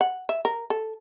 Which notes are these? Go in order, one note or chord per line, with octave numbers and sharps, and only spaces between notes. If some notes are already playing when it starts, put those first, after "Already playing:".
F#5
E5
A#4
A4